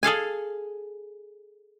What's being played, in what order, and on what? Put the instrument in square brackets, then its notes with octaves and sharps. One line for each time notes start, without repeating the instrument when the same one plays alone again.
[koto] G#4 A4 F5 G#5